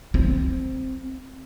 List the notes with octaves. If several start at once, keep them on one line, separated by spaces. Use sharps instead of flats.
C4